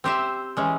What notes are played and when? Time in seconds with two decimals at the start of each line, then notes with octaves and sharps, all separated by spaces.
0.04 C4 G4 C5 E5
0.57 E3 G#3 C#4